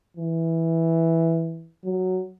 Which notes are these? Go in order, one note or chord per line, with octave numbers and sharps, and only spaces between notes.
E3
F#3